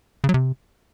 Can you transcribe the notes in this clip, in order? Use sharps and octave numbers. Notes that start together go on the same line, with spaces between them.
C#3
F#3
C3